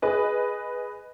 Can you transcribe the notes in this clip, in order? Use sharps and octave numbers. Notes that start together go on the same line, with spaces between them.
G#4 B4 D#5